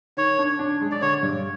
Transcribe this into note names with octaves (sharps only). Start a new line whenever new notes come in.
D#3 C#5
D4
D4
G#3
D5
D3 C#5
G2